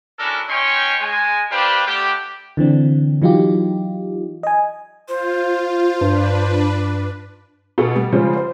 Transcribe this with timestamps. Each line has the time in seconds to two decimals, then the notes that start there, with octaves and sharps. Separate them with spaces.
0.19 C#4 D4 E4 F#4 A4 A#4
0.48 C#4 D#4 C#5 G5 C6 C#6
1.00 G#3 G#5
1.50 D4 G4 B4 C5 F5 G5
1.85 A3 B3 D4 G4
2.57 D3 E3 C4 D4
3.22 E3 F#3 D#4 F4 G4
4.43 D#5 G#5
5.08 F4 C5
6.01 G2 D4 B4
7.78 B2 G#4 A4
7.96 G3
8.12 C#3 F3 G3 G#3 C#4 C5
8.37 C5